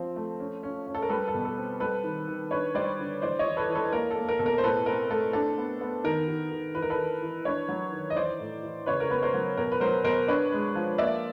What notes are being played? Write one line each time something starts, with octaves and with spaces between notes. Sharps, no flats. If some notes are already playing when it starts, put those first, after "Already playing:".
Already playing: F3 C4
A3
C#4
C#4
C#4
A4
A#4
G3 A4 B4
A4
B2
A4
C4
G3 A4 B4
D#3
D#3
D4 B4 C#5
G3 C5 D5
D3
E3 C5 D5
C#5 D#5
E3
A4 B4
E3
A4 B4
A#3 A#4
A4
A#3
A#4
B2 A4
A#4
C5
A2 A4 B4
C4 A#4
A3 A4
D4 A4
B3
B3
D#3 A#4
D#3
D#3
E3 B4
A#4
A4 B4
E3
E3
D4 B4 C#5
F#3
D#3
D#5
E3 C5 D5
A2
E3
C#3 B4 C#5
A#4
B3 B4
A#4 C5
F#3
B2 A#4
B4
F#3 A#4 C5
B2 A#4 C5
D4 B4 C#5
G#3
F3
A#3 D5 E5